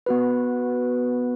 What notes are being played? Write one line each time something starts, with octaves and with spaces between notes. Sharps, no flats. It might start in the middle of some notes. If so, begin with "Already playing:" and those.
B3 F#4 B4